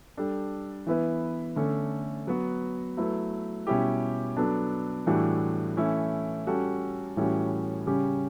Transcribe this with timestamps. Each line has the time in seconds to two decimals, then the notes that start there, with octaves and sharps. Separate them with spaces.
0.17 G3 D4 A4
0.87 E3 B3 E4 B4
1.56 D3 A3 C#4
2.27 F#3 B3 F#4
2.97 F#3 A3 E4 B4
3.67 B2 G3 C#4 E4 G4
4.37 F#3 B3 D4 A4
5.07 A2 E3 G3 D4 F#4
5.77 E3 A3 C#4 E4
6.47 G3 C#4 F#4 A4
7.17 A2 E3 G3 C#4 F#4
7.87 C#3 G3 C#4 G4